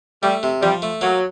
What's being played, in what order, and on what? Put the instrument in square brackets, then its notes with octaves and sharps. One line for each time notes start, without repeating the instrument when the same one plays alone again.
[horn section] G3 [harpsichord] A3
[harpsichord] C3
[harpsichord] F3 [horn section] G3
[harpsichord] A3
[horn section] F#3 [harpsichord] A#3